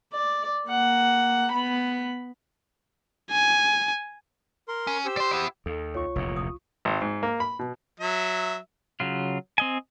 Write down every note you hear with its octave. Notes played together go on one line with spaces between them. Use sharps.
D5
A#3 F#5
B3 B5
G#5
A#4 C6
C#4
G4 C5 E6
D5 C6
E4 F#5
D#2 A4
C2 F4 C#5 C#6
F1 E2 A#2
D#6
G#1
G#2
A#3
B5
B2
F#3 E5
C#3 F#3 F4
C4 D#5 G#5